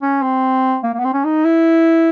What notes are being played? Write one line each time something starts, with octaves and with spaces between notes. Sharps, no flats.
C#4
C4
A#3
A#3
B3
C4
C#4
D#4
E4